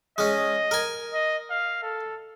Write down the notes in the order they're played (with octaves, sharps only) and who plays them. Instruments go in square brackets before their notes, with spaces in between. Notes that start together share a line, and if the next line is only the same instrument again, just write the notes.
[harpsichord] G#3 C#4 [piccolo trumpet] D#5
[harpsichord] A#4 G#5
[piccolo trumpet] D#5
F5
A4